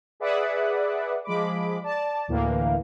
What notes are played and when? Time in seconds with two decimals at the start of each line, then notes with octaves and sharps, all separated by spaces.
0.20 G#4 B4 D5 E5 F#5
1.24 F3 G#3 B5 D6
1.83 D5 A5
2.28 D2 A2 E3 A#3